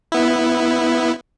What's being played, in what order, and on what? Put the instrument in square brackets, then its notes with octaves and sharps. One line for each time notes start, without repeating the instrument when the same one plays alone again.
[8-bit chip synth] B3 E4